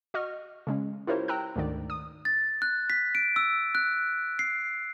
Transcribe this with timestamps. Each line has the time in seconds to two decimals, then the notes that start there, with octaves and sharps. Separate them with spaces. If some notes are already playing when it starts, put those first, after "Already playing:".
0.14 F#4 D#5 C#6 F6
0.67 C#3 G#3 C#4
1.07 E4 F4 G4 A#4 C5 C#5
1.28 G5 A#5 E6 F#6
1.56 D2 G#2 D#3 D5
1.90 D#6
2.25 A6
2.62 F#6
2.90 B6
3.15 D7
3.36 E6
3.75 F#6
4.39 C7